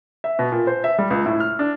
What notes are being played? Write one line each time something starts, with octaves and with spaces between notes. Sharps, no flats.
E5
B2
A#2
C5
E5
G3
C#2
A2
F6
D4